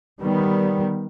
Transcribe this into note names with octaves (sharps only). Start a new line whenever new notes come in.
D#3 G3 B3